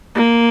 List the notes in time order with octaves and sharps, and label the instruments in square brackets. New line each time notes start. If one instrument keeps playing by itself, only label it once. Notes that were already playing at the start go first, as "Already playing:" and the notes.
[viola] A#3